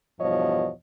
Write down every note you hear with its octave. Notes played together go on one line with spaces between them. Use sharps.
E2 G2 B2 F3 C#5 D#5